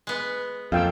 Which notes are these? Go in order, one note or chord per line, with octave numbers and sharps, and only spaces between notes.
G#3 B3
F2 A#3 F4 A4 F5 G5 E6